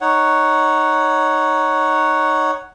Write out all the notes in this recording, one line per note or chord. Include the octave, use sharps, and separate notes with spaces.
D#4 C#5 F#5